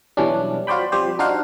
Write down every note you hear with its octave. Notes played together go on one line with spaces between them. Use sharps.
B2 E3 F#3 G3 C#4 D4
F4 F#4 C5 D5 G5 B5
F3 G3 C4 G4 C5
D4 D#4 F#4 C5 F5 F#5